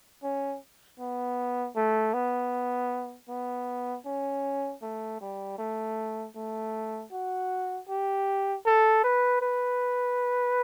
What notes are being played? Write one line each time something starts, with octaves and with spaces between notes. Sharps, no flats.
C#4
B3
A3
B3
B3
C#4
A3
G3
A3
A3
F#4
G4
A4
B4
B4